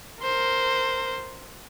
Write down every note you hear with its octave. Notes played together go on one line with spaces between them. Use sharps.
A#4 C5